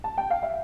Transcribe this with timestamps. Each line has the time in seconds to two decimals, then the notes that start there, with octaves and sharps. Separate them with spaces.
0.04 A5
0.18 G5
0.30 F5
0.43 E5